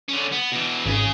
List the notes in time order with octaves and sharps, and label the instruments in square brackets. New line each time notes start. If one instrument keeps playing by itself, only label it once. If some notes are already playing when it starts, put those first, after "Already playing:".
[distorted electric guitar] D3 C#4
B3
B2 E3
[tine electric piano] G#1 [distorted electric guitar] C#3 G#4